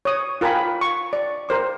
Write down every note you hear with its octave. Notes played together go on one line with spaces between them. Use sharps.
C#5 D#6
F4 A#4 G5 G#5 B5
C#6
D5
A#4 C5 D6